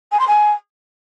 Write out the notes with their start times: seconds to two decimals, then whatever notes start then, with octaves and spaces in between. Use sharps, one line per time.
0.11 G#5
0.19 C6
0.27 G#5